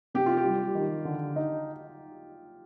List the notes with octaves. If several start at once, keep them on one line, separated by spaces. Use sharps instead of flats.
C3 G4
F4
G4
G3
D#3
D3
D#4